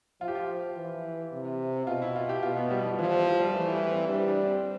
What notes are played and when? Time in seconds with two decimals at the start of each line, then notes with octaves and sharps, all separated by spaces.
0.21 F3 F4
0.28 G4
0.35 F4
0.77 E3
1.33 C3
1.87 B2 F4
2.02 E4
2.16 F4
2.29 G4
2.43 B2 F4
2.56 B3
2.71 G3
2.85 F3
2.98 E3 F3
3.12 E3
3.26 G3
3.40 G3
3.54 E3 A3
3.73 G3
3.91 C4
4.09 G3 D4
4.28 D4
4.46 C4